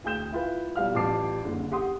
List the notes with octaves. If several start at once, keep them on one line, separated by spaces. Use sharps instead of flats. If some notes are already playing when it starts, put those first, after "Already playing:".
D2 G#4 G5 G6 E7
E4 F4 B4
B1 G3 F5 F6
A1 G3 F4 A5 D6 C7
F#1 D3
G4 F#5 C6 D#6